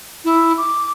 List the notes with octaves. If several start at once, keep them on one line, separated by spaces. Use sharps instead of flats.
E4
D6